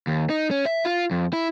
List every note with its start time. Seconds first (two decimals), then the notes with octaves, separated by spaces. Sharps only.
0.07 D#2
0.30 D#4
0.51 C#4
0.66 E5
0.85 F4
1.11 F2
1.33 E4